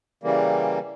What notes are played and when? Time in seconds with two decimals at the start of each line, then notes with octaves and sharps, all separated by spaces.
0.23 C#3 E3 G3 A#3